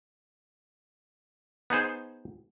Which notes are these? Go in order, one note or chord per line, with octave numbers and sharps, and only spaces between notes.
B3 D#4 G#4 C5